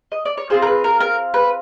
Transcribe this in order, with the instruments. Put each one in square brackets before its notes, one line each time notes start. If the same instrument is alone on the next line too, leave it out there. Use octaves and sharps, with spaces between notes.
[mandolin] D#5
D5
C#5
C4 F4 G#4 C5
A#4
B4
A#4
A#4
B4